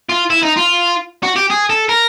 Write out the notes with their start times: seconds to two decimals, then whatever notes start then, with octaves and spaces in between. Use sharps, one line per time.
0.10 F4
0.30 E4
0.42 D#4
0.56 F4
1.23 F#4
1.36 G4
1.50 G#4
1.70 A4
1.89 A#4